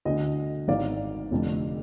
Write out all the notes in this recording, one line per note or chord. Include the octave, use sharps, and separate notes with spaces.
D2 D3 D#5
G#1 G#2 D#3 D5 F5
F1 F2 D3